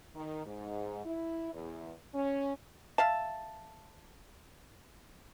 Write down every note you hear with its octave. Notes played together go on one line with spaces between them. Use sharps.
D#3
G#2
E4
E2
C#4
E5 F5 A5